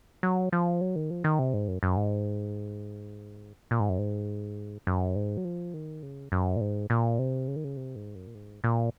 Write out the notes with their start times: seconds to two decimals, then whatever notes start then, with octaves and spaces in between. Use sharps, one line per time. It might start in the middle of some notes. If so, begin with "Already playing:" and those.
0.23 F#3
0.52 F3
0.81 F#3
0.96 D#3
1.11 F3
1.24 D#3
1.39 C3
1.54 G#2
1.68 F#2
1.83 F#2
1.97 G#2
3.71 A#2
3.80 G#2
3.89 F#2
3.98 G#2
4.87 F#2
5.16 G#2
5.37 F#3
5.45 F3
5.74 D#3
6.03 C#3
6.32 F#2
6.56 A#2
6.61 G#2
6.90 A#2
7.19 C3
7.48 C#3
7.56 D#3
7.64 C#3
7.77 C3
7.96 G#2
8.15 F#2
8.27 A#2
8.35 G#2
8.64 A#2